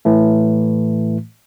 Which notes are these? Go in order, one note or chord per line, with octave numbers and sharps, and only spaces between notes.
A2 E3 A3